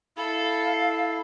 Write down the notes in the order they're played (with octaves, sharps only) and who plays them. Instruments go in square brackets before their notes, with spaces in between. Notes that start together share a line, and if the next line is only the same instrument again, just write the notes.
[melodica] E4 [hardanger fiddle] A4 [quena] F5